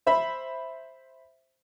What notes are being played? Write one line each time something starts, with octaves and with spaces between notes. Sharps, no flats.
C5 E5 B5